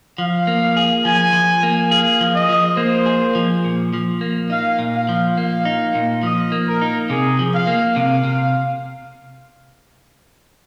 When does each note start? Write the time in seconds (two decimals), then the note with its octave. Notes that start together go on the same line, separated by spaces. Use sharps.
0.18 F3 F5
0.47 A#3
0.77 G#4
1.05 F3 G#5
1.33 F3
1.63 A#3
1.91 G#4 F5
2.21 F3
2.34 D#5
2.49 F3
2.77 A#3 C5
3.06 G#4
3.35 F3
3.65 A#2
3.93 F3
4.21 A#3
4.50 D#4 F5
4.79 A#2
4.94 F5
5.09 F3
5.37 A#3 F5
5.65 D#4
5.95 A#2
6.23 F3 D#5
6.52 A#3
6.67 A#4
6.82 D#4
7.09 C3 G#4
7.39 F3
7.53 F5
7.67 A#3
7.96 C3 F5
8.25 C3